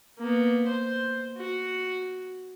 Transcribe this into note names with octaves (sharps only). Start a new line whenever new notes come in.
A#3 B3
C5
F#4